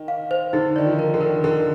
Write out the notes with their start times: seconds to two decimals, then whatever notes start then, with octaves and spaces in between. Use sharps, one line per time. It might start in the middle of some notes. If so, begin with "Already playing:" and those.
Already playing: D#3
0.08 F5
0.31 C5
0.53 D3 D#4
0.76 D#3 D5
0.86 F3
0.99 A#4
1.14 D3
1.21 D#3 A#4
1.44 D3 A#4